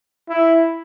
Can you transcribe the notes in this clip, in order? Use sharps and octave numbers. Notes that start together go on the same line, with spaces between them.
E4